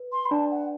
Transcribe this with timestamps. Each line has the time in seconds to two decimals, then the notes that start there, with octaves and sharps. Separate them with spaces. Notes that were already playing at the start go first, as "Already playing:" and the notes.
Already playing: B4
0.12 C6
0.26 B5
0.31 D4 D5 A5
0.51 F#5